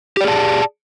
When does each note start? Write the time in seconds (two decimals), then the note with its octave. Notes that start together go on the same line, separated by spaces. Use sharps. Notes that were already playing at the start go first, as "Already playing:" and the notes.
0.17 G4
0.21 D5
0.24 G#4
0.28 A5